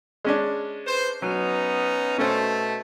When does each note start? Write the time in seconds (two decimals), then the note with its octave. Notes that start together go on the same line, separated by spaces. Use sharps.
0.25 G#3 C#4 D4
0.86 B4 C5
1.22 F#3 B3 C#4 D#4
2.18 B2 A3 C#4 C5